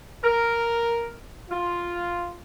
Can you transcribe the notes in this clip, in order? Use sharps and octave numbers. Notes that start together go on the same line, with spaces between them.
A#4
F4